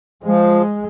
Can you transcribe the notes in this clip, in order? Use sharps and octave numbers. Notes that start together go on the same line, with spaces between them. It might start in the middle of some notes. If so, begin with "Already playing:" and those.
F3 G#3